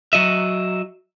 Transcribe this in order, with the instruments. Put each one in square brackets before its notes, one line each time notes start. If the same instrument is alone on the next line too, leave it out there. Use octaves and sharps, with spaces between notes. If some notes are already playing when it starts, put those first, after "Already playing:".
[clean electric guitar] F#3 F#4 D#5 E5